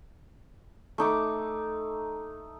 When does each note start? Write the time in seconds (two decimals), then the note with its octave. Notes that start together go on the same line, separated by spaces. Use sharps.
0.98 A3 D#4 D6